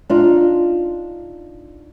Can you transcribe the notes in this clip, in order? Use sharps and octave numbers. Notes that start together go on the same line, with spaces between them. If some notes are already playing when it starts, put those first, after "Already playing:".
D4 D#4 F4